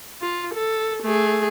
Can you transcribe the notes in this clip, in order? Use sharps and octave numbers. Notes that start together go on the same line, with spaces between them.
F4
A4
A3 G#4